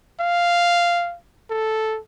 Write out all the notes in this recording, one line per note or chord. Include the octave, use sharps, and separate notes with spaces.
F5
A4